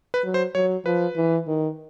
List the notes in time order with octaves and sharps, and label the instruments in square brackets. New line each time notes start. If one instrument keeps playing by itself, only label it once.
[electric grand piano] B4
[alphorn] F#3
[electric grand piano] C5
[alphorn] F#3 [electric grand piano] C#5
[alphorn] F3 [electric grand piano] B4
[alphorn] E3
D#3